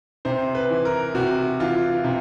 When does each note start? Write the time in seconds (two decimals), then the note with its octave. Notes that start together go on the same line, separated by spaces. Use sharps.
0.25 C3 C5
0.55 B4
0.70 E3
0.85 A#4
1.15 C3 F#4
1.60 E3 F4
2.04 C3